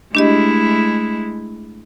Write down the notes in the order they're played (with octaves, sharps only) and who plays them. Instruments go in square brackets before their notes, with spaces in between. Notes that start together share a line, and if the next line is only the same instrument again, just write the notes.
[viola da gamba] G#3 A3 E4 [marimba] D4 G4 D#5